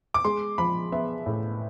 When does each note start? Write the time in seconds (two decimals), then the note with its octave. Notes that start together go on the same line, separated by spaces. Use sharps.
0.14 D6
0.24 G#3 C6
0.58 F3 B5
0.92 B3 E5
1.26 A2